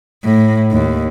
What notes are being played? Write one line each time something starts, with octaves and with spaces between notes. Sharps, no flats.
A2
D#2